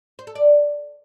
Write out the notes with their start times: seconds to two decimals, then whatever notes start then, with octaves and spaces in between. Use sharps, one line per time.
0.19 C5
0.27 A4
0.35 D5